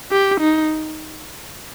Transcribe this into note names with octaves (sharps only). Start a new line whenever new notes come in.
G4
D#4